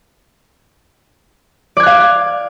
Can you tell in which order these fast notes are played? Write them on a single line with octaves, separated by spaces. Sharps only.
D5 G#6 F#6 F5